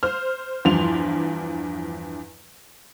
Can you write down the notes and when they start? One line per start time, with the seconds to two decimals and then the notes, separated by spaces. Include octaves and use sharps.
0.03 C5 F6
0.65 E2 G2 F3 C6 F7